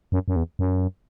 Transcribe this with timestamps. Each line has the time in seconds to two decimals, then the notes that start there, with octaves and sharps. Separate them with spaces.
0.12 F#2
0.28 F#2
0.36 E2
0.59 F#2